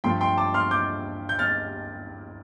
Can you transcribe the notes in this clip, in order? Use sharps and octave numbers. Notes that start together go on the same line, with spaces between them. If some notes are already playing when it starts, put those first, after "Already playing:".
G2 F3 A3 G5 C6
G5 C6
A5 D6
C6 F6
D6 G6
G6
F6 A6